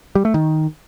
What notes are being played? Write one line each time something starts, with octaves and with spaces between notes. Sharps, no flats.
G3
A3
D#3